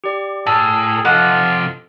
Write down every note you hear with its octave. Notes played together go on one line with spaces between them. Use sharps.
G4 D5
A2 G#4 A5 E6 F6
C3 F3 F4 A4 D#5 F#5 C#7